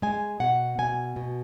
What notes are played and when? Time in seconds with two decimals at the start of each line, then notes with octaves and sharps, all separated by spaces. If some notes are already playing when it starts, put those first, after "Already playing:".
0.02 G#3 G#5
0.40 B2 F#5
0.78 B2 G#5
1.16 B2